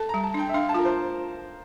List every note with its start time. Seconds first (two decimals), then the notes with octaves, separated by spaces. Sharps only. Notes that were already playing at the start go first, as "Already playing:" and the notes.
Already playing: A4 A5
0.09 G3 A#5
0.24 A5
0.34 D4 G5
0.49 E5
0.54 D4 F5
0.69 A5
0.74 F4 A#4
0.85 C5